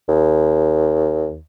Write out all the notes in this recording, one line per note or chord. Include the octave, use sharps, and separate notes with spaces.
D#2